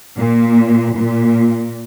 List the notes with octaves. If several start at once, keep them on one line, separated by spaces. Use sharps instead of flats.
A#2
A#2